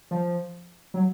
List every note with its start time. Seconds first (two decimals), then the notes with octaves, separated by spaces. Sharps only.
0.11 F3
0.94 F#3